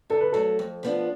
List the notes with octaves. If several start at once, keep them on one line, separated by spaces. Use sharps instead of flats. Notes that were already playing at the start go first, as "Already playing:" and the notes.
D3 A4
B4
F#3 A3 A4
F2
F3 B3 D4 F4